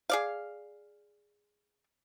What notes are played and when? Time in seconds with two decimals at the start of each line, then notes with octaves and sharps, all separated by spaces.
0.10 G#4 D5 F5